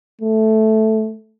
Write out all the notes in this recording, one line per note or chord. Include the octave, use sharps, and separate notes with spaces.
A3